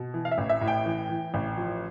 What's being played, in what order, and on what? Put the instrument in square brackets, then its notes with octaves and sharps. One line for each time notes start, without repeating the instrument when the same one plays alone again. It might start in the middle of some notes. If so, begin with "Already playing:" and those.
Already playing: [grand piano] B2
E3
F5
E5
A1
E5
A2
G5
E3
E3
A1
F3